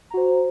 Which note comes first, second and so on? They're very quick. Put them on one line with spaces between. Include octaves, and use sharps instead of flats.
A#5 F#4 C5